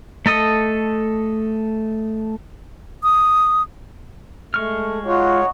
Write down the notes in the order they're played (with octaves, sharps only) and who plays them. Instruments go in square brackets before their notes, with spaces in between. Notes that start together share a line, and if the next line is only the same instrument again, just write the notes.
[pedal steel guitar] A3 A4 D#5 D#6
[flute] D#6
[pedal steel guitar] G#3 C#6 F6 [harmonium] A3
[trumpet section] D#4 F#4 [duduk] F4 [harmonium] C#5